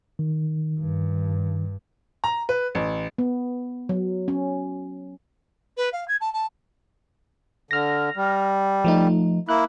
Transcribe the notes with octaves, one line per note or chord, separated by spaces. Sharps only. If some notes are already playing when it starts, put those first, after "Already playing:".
D#3
G2
A#5
B4
A1
B3
F#3
C#4
B4
F5
G#6
A5
A5
D3 F6 A#6
G3
F3 A3 D#4
A#3 E4 F#6